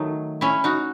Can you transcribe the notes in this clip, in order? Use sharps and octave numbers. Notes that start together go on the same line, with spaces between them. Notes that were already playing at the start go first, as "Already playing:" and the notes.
Already playing: D#3 F#3 A3 D#4
C#4 E4
D#4 F#4